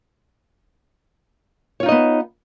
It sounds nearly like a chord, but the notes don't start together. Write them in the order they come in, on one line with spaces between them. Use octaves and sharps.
C#5 F4 D#4 D#5 B3